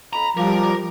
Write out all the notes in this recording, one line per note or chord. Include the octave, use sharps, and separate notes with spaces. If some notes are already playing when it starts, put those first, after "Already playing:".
F2 A#5 B5
F3 G3 A#4 A#5 D6